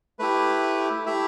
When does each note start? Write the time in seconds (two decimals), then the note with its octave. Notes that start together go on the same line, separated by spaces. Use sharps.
0.19 A3 E4 G4 B4
1.06 A3 E4 G4 E5